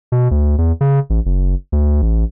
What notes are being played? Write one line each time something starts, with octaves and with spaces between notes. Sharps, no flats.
B2
D2
E2
C#3
A1
F#1
D2
A1